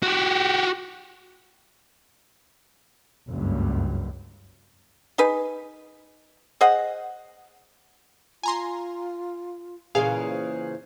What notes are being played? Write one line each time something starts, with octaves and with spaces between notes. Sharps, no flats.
F#4 G4
F#1 C#2 G2
D#4 G#4 B4
G#4 C5 D#5 F#5
F4 G#5 A#5 C6
A#2 C#3 E3 G#4 F5
C5